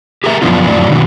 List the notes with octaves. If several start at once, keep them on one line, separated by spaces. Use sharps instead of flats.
G4 G#4 A#4 D#5 E5
F#2 B2 F3 B3 D4 F4
F2 A2 F#3 D5
B2 D#3 D4 F#4